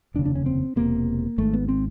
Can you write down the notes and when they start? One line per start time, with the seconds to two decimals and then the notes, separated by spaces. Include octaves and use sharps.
0.14 F1 D#2 C#3 D4
0.25 D4
0.35 C#4
0.46 C4
0.76 E1 E2 C3 A#3
1.38 G#1 G#2 A3
1.53 B3
1.69 C4